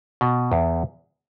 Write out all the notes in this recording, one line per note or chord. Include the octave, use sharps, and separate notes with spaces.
B2
E2